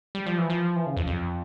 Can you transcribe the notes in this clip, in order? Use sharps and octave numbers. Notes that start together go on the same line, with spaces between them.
G3
F3
E3
F3
E3
C#3
F2
F2